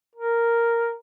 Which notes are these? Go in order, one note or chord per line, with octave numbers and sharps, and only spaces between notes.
A#4